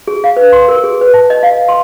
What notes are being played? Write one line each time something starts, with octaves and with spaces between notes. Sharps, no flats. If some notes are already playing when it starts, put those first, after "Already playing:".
G#4
F5
B4
C6
A#4
G#4
B4
A5
D#5
F5
C6